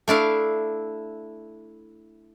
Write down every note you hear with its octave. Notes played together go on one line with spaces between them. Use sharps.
A3 D4 E4 F5